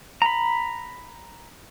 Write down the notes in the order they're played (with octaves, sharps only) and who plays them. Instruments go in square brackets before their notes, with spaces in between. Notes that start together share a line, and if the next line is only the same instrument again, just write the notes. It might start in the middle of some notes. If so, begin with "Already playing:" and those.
[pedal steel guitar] A#5 B5